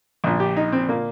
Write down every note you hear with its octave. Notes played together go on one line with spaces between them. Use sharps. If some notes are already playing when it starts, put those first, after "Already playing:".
A#1 A#2
G4
D#4
C4
A#2 A#3